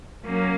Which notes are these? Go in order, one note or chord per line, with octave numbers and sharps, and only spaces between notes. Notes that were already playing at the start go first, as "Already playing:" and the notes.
F#3 A#3 C#4